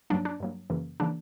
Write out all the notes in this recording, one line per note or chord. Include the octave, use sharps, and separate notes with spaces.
G2 F#3 A#3 D4
D4
G2 F#3 A#3
F#2 C#3 E3 A#3
C#3 E3 A#3 D4